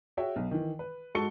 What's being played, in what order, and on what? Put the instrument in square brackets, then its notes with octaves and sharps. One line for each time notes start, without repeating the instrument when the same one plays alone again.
[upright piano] F#4 G#4 C#5 E5 G5
B1
D#3 E3
B4
G#2 F#4 A4 C#6 C#7 G7